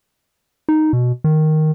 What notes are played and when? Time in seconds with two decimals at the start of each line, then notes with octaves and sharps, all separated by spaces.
0.69 D#4
0.93 B2
1.24 D#3